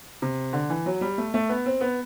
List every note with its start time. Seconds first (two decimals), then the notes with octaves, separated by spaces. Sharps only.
0.22 C3
0.53 D3
0.70 E3
0.86 F#3
1.01 G3
1.18 A3
1.34 A3
1.49 B3
1.66 C4
1.81 B3